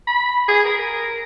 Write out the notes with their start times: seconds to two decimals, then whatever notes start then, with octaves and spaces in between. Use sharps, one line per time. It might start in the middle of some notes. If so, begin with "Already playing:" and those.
0.07 B5
0.48 G#4
0.64 A#4